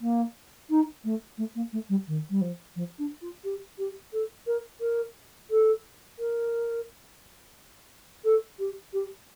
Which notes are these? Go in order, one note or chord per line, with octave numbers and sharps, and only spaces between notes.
A#3
D#4
A3
A3
A#3
A3
G3
D#3
G3
F3
F3
D4
F4
G4
G4
A4
A#4
A#4
A4
A#4
A4
G4
G4